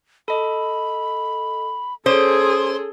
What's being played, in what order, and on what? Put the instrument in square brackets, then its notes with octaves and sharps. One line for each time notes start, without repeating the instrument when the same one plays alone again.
[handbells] A4 D#5 [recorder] B5
[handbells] C#4 C#5 D7 [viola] G#4 A4 [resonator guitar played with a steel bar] C5 [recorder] D#6